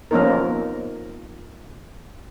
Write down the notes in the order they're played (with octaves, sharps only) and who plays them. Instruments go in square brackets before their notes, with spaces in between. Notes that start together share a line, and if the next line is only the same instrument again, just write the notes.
[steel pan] F3 A#3 B3 C#4 D#4 A#4